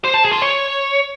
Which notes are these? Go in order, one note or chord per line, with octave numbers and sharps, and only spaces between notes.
C5
A5
G#4
F4
C#5